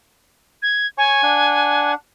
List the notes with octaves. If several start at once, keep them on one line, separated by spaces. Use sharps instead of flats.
G#6
C#5 G#5 C#6
D4 F#5